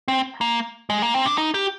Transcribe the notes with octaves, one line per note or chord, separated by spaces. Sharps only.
C4
A#3
G#3
A#3
C4
D4
D#4
G4